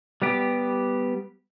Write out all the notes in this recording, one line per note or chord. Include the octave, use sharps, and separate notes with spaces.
G3 B3 G4